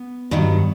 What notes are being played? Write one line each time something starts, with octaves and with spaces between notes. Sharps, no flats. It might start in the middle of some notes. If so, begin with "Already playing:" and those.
Already playing: B3
G2 D#3 F#3